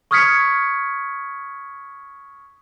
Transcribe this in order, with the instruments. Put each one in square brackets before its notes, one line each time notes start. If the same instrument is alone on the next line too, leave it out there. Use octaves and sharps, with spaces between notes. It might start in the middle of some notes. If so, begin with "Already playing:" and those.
[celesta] C#6 D#6 F6 G#6 B6 C#7